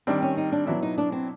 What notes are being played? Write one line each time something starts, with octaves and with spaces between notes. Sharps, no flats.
D#3 G3 C4 D4
C#4
D#4
D4
B2 F#3 B3 D4 E4
D#4
D4
C4